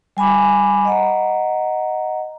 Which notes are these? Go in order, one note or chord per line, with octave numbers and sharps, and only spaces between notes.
G3 G#5 B5 D6
D#5 F#5 A#5